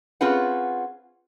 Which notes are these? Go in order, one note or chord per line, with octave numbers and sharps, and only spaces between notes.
C4 C#4 F4 G#4 B4 F#5